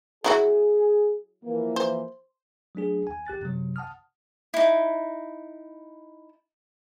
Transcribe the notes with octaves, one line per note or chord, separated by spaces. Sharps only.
F#3 E4 F#4 G#4
E3 F3 A#3
C5
F#3 A3 D4 G#4
D#2 G#5
A1 G4 F#6 A6
F#2 C3 F#3
F#5 A5 D#6 F6
D#4 E4